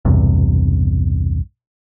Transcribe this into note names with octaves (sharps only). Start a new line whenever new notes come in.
B1 E2 G2 C3